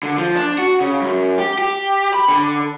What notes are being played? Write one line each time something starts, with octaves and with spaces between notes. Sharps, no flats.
D3
F3
D4
F#4
C#3
F#2
G4
G4
B5
D3